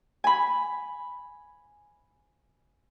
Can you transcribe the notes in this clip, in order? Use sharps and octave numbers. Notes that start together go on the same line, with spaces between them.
G#5 B5